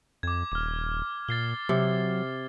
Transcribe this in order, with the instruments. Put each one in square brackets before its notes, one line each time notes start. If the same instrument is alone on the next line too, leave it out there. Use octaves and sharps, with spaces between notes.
[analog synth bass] F2 [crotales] D6 G#6
[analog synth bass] D#1 [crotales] D6 F6
[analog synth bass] A#2 [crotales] A6 C7 G7
[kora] C3 [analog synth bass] F#3